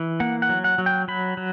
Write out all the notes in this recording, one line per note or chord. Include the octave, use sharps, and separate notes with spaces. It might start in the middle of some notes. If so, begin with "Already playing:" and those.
Already playing: E3
A#3 F#5
F#5
F#3
F#5
F#3
G5
F#3 B5
F#3